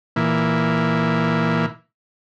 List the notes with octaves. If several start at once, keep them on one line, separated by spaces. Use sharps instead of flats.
A#2 E3